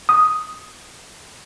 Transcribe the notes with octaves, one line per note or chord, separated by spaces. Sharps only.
D#6